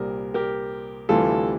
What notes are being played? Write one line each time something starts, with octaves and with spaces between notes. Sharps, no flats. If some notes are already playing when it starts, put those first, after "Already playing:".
Already playing: C2 A#2 G3 A#4
G4 A#4
D2 C3 E3 G3 F4 A4